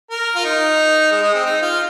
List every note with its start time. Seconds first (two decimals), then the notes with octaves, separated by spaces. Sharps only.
0.11 A#4
0.36 F4
0.45 D#4
1.11 G#3
1.23 G#3
1.34 C4
1.46 D#4
1.62 F4